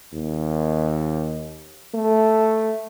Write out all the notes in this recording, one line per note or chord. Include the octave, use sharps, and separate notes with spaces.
D#2
A3